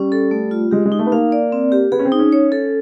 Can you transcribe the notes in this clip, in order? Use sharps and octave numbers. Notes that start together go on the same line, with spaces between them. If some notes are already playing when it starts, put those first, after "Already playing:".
Already playing: G3 C#4
A4
A3
F4
G#3 G4
G#3
D#4
A3
B3
A#3 F5
D5
C4
G4
B3 G#4
C#4
C4
D#4
C#4
C#5
A4